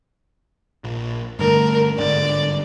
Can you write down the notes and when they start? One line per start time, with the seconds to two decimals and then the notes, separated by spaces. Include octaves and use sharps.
0.84 A#1
1.39 G2 D3 A3 A#4
1.98 G1 G#2 D3 D5